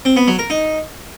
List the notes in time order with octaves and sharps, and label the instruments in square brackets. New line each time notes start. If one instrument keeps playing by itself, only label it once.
[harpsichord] C4
B3
F#3
A#4
D#4